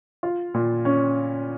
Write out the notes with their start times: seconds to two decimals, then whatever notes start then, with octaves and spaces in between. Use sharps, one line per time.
0.23 F4
0.54 A#2
0.85 C#4